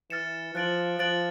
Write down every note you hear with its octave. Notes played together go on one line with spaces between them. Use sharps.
E3 F6 A6 C#7 E7
F3 F#6 A6 D7 F#7
F3 F#6 A6 D7 F#7